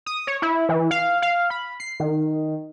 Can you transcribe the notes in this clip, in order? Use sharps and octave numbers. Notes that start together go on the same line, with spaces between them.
D#6
C#5
E4
E3
F5
F5
B5
C7
D#3